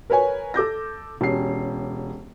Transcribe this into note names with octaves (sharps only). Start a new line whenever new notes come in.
A#4 B4 C#5 G#5
A4 D6 G6 A#6
E1 C#4 G4 C7